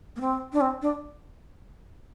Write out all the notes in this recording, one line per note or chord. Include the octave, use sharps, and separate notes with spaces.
A#3
C4
D4
C4
D4